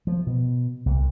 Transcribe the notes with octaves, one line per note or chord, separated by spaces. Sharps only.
F3
B2
C2